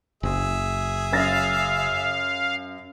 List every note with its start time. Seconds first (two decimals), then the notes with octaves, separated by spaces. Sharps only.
0.23 F#1 G#4 E5
1.12 F#2 F5 A6 A#6